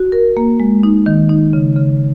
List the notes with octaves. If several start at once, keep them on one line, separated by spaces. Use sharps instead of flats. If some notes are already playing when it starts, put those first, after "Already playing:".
Already playing: F#4
A#4
A#3
G#3
D#4
D#3
D#4
C#3
C#3